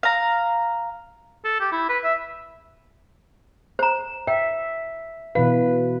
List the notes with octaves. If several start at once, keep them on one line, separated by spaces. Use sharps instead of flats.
F5 A#5
A4
G4
E4
B4
E5
C5 A#5
E5 G5
B2 E3 B4 F5